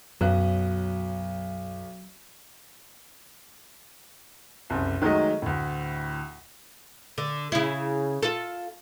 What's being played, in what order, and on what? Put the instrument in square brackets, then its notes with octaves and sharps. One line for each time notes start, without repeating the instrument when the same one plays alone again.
[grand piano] B1 B3 F#6 [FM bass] F#2 [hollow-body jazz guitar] F#3
[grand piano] F#1 C2
D#3 F#3 G#3 A3 D#5
D2 A2
[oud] D3
C#3 E4
F4 A4